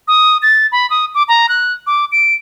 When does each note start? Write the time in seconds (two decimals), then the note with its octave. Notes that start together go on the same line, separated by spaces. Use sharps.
0.08 D#6
0.42 A6
0.72 B5
0.90 D#6
1.15 D6
1.28 A#5
1.49 F#6
1.87 D6
2.12 D7